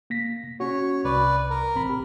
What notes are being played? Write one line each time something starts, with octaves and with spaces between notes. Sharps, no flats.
A#3 A#6 B6
C#4 F#4 C#5
C2 B4 D5
A#4
A1 C4 B5
G4